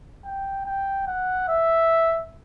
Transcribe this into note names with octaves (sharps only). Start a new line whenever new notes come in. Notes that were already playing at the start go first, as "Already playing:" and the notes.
G5
G5
F#5
E5